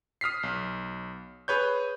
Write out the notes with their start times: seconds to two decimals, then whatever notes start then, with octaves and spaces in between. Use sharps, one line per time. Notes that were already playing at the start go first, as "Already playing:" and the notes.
0.21 D#6 F6 B6 C7
0.43 B1
1.48 G#4 B4 C#5 G6